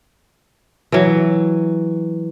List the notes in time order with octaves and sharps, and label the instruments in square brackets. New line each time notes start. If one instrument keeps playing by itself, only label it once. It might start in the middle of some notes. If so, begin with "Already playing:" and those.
[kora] E3 F#3